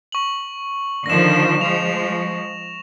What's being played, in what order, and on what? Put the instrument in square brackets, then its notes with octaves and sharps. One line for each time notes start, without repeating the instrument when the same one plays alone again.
[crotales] C#6 F#7
[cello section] D3 D#3 F3 [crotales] A#6 E7
[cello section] F3 G#3 [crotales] F7